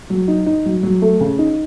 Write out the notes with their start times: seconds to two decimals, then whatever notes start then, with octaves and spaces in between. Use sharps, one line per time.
0.10 F#3
0.28 D#4
0.46 D#4
0.66 F#3
0.83 F#3
1.02 A3
1.21 C#3
1.39 D#4